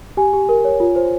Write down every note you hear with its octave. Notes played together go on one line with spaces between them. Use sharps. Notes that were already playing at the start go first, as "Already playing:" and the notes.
G4 G#5
G4
A#4
C#5
F4
C5